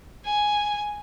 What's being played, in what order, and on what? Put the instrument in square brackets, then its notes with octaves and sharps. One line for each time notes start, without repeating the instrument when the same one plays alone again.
[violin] G#5